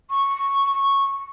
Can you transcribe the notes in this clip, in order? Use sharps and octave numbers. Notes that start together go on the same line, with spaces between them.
C#6